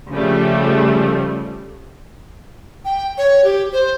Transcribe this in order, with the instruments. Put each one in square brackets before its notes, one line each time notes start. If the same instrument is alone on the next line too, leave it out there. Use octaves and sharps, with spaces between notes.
[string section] C#3 F3 G3 A3
[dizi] G5
C#5
G4
C5